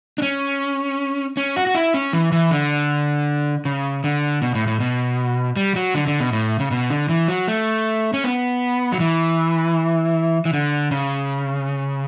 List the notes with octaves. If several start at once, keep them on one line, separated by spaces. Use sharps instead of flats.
D4
C#4
C#4
F#4
F#4
E4
C#4
E3
E3
D3
C#3
D3
B2
A2
A2
B2
G3
F#3
D3
D3
B2
A2
C#3
B2
D3
E3
F#3
A3
C#4
B3
F#3
E3
E3
D3
C#3